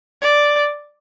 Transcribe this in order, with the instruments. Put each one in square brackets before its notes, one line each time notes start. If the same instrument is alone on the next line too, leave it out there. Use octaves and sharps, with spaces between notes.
[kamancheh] D5